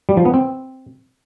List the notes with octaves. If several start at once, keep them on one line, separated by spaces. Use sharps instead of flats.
G3
F3
B3
C4